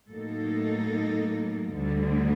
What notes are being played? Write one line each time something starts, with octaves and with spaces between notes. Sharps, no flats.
A2 F#3 A#3 D#4 A4
D2 D3 G3